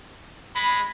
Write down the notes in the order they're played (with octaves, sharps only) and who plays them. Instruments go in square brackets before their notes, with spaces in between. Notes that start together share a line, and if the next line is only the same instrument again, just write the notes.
[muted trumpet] G#3 [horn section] B5